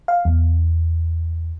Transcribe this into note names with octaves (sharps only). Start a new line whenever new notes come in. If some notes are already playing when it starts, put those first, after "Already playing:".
F5
E2